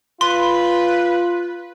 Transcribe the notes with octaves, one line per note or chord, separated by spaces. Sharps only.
F4 B4 C6